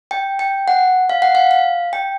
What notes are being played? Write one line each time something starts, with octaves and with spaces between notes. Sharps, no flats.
G5
G5
F#5
F5
F#5
F5
F5
G5